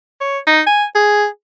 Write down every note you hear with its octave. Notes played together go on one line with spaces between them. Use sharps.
C#5
D#4
G#5
G#4